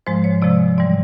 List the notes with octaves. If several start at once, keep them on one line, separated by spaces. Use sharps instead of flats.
G#2 F3 G#3 C5
C#5
C3 F3 G#3 D5
G#2 E3 G3 D5